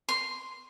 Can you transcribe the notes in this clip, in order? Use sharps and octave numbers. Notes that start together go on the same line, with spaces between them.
C6